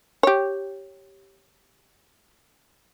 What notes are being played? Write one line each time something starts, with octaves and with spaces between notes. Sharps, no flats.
G4 C#5